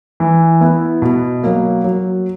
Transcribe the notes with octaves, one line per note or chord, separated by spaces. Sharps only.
E3
B3 E4
B2
F#3 A#3
F#3